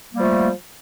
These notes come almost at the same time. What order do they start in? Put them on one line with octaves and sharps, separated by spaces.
A#3 G3 F3 A3